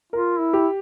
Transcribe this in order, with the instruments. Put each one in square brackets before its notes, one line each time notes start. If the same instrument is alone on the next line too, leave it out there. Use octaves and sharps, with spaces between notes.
[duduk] F4 [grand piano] A#4
[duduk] E4
[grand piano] G4